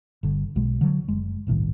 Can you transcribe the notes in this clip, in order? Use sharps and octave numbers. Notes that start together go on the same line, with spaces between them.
G1 D3
B1 B2 G#3
D3 F#3
F#1 G#3
G1 C2 A2 D#3